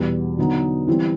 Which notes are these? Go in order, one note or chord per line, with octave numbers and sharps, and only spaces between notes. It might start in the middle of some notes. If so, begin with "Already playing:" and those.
Already playing: E2 B2 G3
D3 F#3 B3 D#4
E3 G3 C4 E4